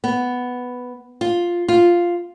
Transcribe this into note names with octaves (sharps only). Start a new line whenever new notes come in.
B3
F4
F4